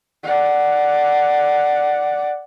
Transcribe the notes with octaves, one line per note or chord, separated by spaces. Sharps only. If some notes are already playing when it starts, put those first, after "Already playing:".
D5 F#5